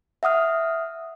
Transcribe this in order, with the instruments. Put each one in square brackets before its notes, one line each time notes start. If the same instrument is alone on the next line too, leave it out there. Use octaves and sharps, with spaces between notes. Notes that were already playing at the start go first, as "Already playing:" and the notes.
[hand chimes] E5 F#5 D#6 F6